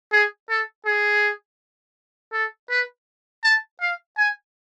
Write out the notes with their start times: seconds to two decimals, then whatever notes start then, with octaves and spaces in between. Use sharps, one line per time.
0.12 G#4
0.49 A4
0.85 G#4
2.33 A4
2.70 B4
3.44 A5
3.80 F5
4.17 G#5